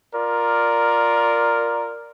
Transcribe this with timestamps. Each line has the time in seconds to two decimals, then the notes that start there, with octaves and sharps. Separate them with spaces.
0.14 F4 A#4 D5